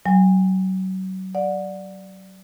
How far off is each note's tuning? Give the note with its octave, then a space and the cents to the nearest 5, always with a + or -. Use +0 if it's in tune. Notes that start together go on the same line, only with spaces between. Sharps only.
F#3 +30 G#5 -25
D5 +0 F#5 -25